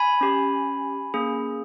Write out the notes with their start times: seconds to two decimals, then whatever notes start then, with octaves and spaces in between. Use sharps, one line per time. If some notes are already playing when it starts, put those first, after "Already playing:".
Already playing: G#5 B5
0.21 C#4 G4
1.14 A#3 C#4 G#4